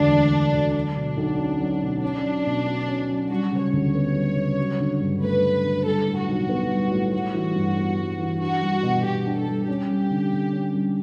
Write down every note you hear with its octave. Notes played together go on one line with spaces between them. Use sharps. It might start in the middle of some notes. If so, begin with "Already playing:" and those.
Already playing: E1 D2 D3 D4
A3
D3
D2
F#3 D4
B2
B1
C#4
F#3
B2
C#4 D4
F#3
B2
F#4
C#4
F#3
G3 F#4
C#3
C#5
D2
B3
G3
C#3
F#3
D3
G2
A3 B4
F#3
D3
G3 A4
A2
F#4
B1
B3
G3
A2
G3 F#4
E3
G2
B3
G3
E3
D4 F#4
G3
B2
B2 G4
D4
A4
G3
C#4 G4
G3
D3
D3
C#4
G3